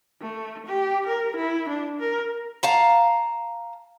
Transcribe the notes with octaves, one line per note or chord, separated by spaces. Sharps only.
A3
G4
A#4
E4
D4
A#4
F5 A5 A#5